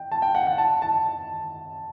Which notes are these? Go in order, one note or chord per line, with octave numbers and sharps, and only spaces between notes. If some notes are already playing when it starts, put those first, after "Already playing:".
Already playing: G5
A5
G5
F#5
F#5
A5
A5